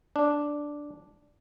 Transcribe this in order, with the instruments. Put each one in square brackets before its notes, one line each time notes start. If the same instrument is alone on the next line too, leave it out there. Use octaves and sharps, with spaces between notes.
[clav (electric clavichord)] D4